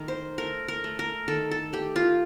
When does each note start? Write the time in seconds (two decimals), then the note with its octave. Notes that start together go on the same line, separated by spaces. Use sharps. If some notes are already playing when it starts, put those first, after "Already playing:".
Already playing: D#3 A3 A#4
0.08 C5
0.38 A3 A#4
0.68 A#4
0.84 A3
0.99 A#4
1.28 D#3 A4
1.51 A4
1.73 A3 G4
1.96 F4